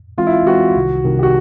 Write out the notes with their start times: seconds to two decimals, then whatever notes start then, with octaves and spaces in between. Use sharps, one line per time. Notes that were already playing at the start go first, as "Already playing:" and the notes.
0.18 E3 G#3 C4 F4
0.27 E4
0.32 F4
0.46 E3 G#3 C4 F#4
0.76 C2 C3 D#3
1.04 C2 C3 D#3
1.19 G4
1.23 F#4